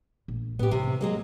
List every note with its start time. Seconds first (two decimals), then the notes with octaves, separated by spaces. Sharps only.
0.28 A#1
0.59 A2 B3 G4
0.71 C3 D#3 D4
1.01 F#3 G#3 A#3